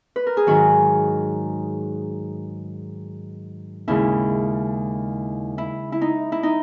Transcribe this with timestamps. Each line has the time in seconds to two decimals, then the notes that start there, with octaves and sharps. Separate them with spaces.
0.16 B4
0.27 A#4
0.37 G#4
0.47 G#2 D#3 F#3 F#4
3.88 D#2 C#3 G#3 E4
5.58 E4
5.92 E4
6.01 D#4
6.32 E4
6.43 D#4